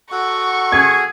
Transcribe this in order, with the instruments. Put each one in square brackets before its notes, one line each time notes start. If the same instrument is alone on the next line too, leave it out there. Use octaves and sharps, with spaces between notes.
[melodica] F#4 A4 F#5 [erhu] C#6
[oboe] G#4 [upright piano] G#6